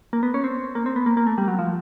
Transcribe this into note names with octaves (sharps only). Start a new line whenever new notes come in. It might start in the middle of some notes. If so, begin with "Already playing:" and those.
A#3
B3
C#4
C4
A#3
C4
B3
A#3
A#3
A3
G3
F#3
F3